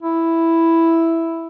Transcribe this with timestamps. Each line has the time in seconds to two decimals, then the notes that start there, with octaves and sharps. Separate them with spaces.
0.02 E4